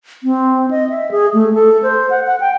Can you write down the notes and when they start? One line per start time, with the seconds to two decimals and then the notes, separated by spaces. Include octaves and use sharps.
0.23 C4
0.71 D#5
0.90 E5
1.11 G#4
1.34 A3
1.54 A4
1.83 C5
2.10 F#5
2.27 F#5
2.40 G5